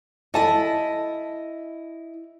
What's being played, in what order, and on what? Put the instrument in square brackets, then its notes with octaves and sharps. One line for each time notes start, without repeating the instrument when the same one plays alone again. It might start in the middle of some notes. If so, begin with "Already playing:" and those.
[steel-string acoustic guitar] E4 D#5 [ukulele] A4 A5